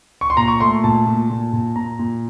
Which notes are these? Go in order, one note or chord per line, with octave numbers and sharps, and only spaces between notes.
C#6
C6
A#2 A#5
C#6
A3 C6
A#2 A5
A#2
A#2
A#2
A#2 A#5
A#2